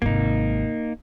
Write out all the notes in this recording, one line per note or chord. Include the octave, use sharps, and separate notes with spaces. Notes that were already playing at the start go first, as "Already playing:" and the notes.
G#1 C3 A#3 D#4